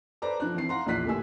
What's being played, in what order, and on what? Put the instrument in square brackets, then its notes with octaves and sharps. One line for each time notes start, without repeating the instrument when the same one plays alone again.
[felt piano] A4 B4 C5 D5 A#5 D6
F3 D4 F#6
E3 C4 C7
F5 F#5 A#5 C6
A#1 E2 F4 F#6 B6 C7
D2 A2 A#3 G4 G#5 E6